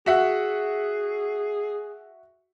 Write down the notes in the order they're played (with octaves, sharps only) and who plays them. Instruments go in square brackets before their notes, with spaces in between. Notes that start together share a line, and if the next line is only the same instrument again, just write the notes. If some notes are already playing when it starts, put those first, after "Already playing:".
[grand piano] F#4 E5 F#5 [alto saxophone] G#4